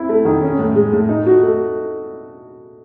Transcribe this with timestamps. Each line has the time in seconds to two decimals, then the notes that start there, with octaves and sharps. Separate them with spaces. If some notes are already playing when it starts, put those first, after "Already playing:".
Already playing: C4 E4
0.09 A3
0.25 D#3
0.41 C#4
0.59 A2
0.75 G#3
0.93 A2
1.09 D#4
1.26 F#4
1.43 A3